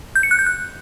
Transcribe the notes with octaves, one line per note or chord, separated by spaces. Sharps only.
G6
C#7
F#6
G6
F#6